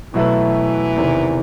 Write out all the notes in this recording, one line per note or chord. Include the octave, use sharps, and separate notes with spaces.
B2 E3 F#3 A3 E4 B4
E2 C3 D#3